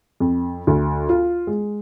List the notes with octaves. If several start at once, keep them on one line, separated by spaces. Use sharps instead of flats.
F2
D2
F4
G#3